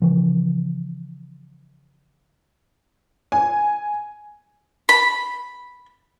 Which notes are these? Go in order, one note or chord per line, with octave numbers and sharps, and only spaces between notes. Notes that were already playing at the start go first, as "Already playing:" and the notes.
C#3 E3 F3
G#5
B5